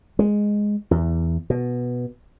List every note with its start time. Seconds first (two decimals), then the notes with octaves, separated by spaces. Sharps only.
0.19 G#3
0.91 E2
1.50 B2